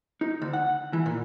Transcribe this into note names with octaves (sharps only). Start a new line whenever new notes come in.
D#4
D2
F#5
E3
A#2